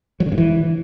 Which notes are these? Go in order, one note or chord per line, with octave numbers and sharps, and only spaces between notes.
F#3
D3
G2
E3